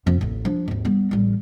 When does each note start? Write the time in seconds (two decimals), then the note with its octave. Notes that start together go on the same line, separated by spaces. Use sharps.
0.06 F2 B3
0.21 A1 D#2
0.45 F3 D4
0.68 G#1 D#2
0.85 G3 B3
1.11 A1 G3